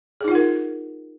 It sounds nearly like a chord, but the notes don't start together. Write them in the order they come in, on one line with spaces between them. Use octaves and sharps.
G#4 D#4 F4 F#5 A#4